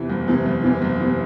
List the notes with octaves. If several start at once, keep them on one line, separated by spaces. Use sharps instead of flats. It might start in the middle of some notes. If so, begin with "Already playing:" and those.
Already playing: E2 C3 E3
F#1
E2 C3 E3
F#1
E2 C3 E3
F#1
C3 E3